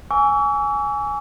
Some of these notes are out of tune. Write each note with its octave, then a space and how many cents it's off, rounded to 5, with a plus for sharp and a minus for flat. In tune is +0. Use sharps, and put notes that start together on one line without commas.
G#5 +0 C#6 +45 E6 +0